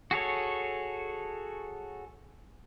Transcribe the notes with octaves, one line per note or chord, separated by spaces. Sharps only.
F#4 G#4 A4 C#5